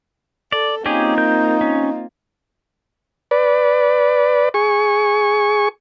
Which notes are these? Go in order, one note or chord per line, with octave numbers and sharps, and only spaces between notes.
A4 D5
A#3 C4 C#4 D#4 F4 G4 G#4
A#4 G6
C#4
B4 D5
G#4 C#6